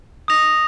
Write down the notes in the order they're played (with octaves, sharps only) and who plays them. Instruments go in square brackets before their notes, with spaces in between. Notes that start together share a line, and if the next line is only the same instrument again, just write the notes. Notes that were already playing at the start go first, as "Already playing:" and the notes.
[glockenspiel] D#6 A#6 F7